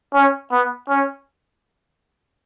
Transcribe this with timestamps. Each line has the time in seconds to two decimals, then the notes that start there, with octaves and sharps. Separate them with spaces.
0.14 C#4
0.52 B3
0.89 C#4